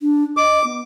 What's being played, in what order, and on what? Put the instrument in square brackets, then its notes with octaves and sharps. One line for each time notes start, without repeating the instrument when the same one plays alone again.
[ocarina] D4
[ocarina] D#5 [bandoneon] D6
[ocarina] B3